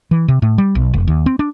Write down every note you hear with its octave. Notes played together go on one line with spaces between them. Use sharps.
E3
C3
A2
G3
B1
F1
D#2
C4
D4